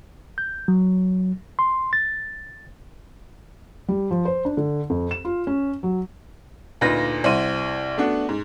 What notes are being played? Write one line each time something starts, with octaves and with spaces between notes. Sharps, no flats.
G6
F#3
C6
A6
G3
F3
C5
D4
D3
F2
E7
F4
C#4
F#3
D2 A#2 D#4 F4 B4 A#6
C2 C4 E4 F#5 C6 D#7
A3 B3 D4 F#4
G#2